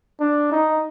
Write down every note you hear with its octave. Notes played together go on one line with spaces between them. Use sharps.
D4
D#4